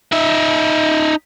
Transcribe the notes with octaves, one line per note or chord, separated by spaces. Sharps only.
D#4 E5